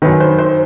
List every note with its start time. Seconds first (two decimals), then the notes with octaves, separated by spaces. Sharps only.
0.02 F#2 D#3 B4
0.20 C5
0.39 C5